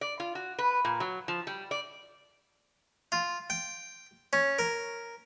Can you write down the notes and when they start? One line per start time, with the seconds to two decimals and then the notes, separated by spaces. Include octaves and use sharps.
0.01 D5
0.20 F4
0.35 F#4
0.59 B4
0.85 A#2
1.00 F#3
1.28 F3
1.47 G3
1.71 D5
3.12 F4
3.50 G5
4.33 C#4
4.59 A#4